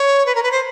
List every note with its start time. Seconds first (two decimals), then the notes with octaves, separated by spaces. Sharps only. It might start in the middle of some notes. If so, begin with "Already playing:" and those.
Already playing: C#5
0.26 B4
0.35 A#4
0.43 B4
0.52 C5